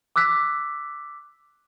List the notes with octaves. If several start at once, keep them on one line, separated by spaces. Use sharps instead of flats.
D6 E6 F#6 B6